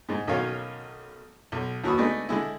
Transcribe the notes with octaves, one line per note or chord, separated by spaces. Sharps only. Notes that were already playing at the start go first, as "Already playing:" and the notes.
G#2 G#3
B1 D#3 F#3 C#4 C#5 F5
B1
D#2 F#4 B4 C#6 D#6
D3 G#3 A3 B3 D4 D#4
D3 G#3 E4